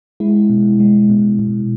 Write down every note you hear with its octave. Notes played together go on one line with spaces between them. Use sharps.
G#3 E4
B2
G#3
B2
B2